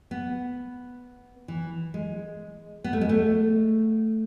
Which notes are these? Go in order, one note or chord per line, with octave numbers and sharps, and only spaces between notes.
B3
E3
G#3
B3
A3
G#3
A3